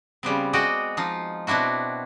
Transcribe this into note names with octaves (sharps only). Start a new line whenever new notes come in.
C#3 G3 B3 C4
G#3 F#4 D5 D#5 G5
F3 D#4 F4
B2 C4 D4 E4 F#4